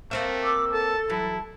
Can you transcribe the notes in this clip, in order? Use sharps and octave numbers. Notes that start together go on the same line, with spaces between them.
A3 A#3 C4 E5
D6 E6
A4 A5
E3 F#3 E4 A5